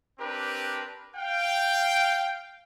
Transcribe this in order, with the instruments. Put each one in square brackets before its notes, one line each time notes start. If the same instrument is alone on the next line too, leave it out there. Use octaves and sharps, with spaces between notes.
[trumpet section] C4 D4 G4 A#4 B4
F5 G5